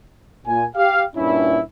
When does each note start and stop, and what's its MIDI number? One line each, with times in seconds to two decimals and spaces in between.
0.47 0.65 46
0.47 0.65 80
0.76 1.03 67
0.76 1.03 77
1.16 1.62 43
1.16 1.62 46
1.16 1.62 61
1.16 1.62 62
1.16 1.62 64